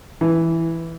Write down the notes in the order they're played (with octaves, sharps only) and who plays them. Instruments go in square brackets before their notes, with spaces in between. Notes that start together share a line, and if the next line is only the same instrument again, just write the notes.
[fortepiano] E3